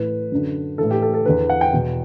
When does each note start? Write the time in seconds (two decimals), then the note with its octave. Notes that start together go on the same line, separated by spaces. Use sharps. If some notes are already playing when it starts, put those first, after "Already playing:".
Already playing: A2 E3 B4
0.32 F#2 D3
0.78 A2 E3 A4
0.91 G4
1.02 A4
1.14 A4
1.26 E2 D3 B4
1.50 F#5
1.61 G5
1.73 E2 B2